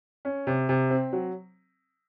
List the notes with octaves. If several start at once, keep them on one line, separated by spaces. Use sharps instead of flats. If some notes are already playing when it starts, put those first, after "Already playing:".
C#4
C3
C3
C4
F#3